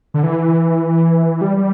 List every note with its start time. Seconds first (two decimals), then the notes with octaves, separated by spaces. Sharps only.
0.14 D3
0.23 E3
1.41 G3
1.57 G3